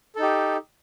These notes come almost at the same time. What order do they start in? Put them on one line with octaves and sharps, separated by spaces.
A4 D#4 G4